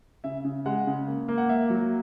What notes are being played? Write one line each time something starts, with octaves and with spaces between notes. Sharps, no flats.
C#3 E5
C#3
G#3 F#5
C#3
A#3
A#3
F#5
A#3 E5
F#3